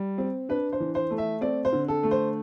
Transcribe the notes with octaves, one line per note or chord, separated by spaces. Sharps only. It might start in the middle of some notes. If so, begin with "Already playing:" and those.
Already playing: G3
C4
D4 B4
C5
E3
C5
A3
E5
C4 D5
C5
D3
A4
A3
C5